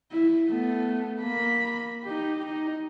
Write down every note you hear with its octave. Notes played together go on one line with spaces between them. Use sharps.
E4
A3 B3
A#3 B5
D#4 G4
D#4